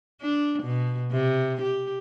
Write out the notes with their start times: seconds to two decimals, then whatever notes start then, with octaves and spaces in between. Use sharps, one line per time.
0.21 D4
0.62 B2
1.11 C3
1.61 G4